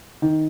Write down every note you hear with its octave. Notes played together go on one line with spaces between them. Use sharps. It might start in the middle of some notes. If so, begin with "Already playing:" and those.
D#3